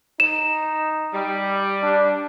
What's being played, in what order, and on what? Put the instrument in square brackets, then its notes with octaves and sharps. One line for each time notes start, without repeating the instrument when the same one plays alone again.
[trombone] D#4 [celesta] E7
[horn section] G3
[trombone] D4